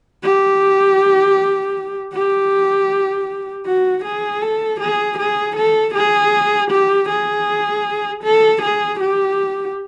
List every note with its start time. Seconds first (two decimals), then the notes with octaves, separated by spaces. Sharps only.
0.23 G4
2.14 G4
3.66 F#4
4.05 G#4
4.42 A4
4.80 G#4
5.18 G#4
5.56 A4
5.95 G#4
6.71 G4
7.09 G#4
8.24 A4
8.62 G#4
9.00 G4